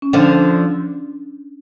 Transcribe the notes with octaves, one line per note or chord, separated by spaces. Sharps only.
C#4
D3 F3 D4